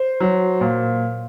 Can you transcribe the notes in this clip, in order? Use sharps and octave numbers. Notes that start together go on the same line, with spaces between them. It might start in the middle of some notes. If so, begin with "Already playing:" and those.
Already playing: C5
F#3
A#2